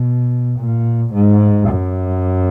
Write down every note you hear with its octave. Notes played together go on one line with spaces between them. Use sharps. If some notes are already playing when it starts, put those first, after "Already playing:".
Already playing: B2
A#2
G#2
F#2